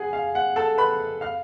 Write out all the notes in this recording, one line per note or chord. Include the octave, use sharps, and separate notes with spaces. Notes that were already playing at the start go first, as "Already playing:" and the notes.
Already playing: G#4 F#5 G#5
F5
F#5
A4 A5
B4 B5
F5 F6